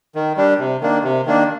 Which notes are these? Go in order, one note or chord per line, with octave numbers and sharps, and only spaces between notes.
D#3
G3 D4
C3
D#3 A#3 D4
C3
D#3 A#3 D4